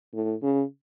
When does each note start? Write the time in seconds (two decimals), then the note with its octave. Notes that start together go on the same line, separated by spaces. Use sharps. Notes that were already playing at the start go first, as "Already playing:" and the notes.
0.14 A2
0.43 C#3